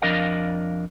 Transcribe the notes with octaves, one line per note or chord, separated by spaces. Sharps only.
F2 F3 D4 A#4 D#5 F5